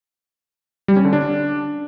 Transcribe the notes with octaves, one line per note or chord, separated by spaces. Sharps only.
G3
C#4
D3
D4